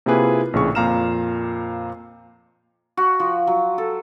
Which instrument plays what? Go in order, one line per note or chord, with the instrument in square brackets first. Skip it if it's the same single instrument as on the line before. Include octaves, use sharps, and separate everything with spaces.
[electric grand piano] C3 A#3 E4 F4 G#4 B4
A#1 A2 C#3 C#6
F2 A#2 F5 A#5 F6 E7
[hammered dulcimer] F#4
F3
F#3
A4